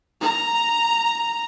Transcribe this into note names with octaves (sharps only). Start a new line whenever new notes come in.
A#5